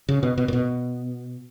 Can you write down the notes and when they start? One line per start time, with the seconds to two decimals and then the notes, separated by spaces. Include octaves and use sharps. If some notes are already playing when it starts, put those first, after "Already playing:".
0.09 C#3
0.23 B2
0.38 B2
0.48 A#2
0.53 B2